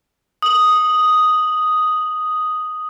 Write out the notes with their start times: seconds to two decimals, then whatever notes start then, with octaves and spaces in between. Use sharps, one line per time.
0.42 D#6 F#7